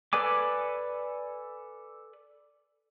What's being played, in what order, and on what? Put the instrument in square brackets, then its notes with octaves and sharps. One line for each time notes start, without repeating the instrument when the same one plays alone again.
[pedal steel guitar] A4 B4 D5 G#5 D6